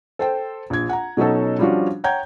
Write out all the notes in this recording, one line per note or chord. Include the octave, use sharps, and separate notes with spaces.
A4 C5 G5
A#1 G#6
F#5 A#5
B2 F#3 C#4 D#4 A4
F3 G3 C#4 D4 F4 F#4
C#5 F#5 G5 A#5 G6 G#6